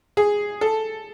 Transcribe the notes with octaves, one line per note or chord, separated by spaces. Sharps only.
G#4
A4